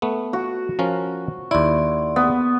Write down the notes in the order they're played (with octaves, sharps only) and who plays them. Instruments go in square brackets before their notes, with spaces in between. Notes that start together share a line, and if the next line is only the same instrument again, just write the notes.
[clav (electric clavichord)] A3 B3
[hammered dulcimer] F#4
[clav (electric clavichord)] F3 C#4 A#4
[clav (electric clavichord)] D#2 E4 [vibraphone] D5 C6
[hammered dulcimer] B3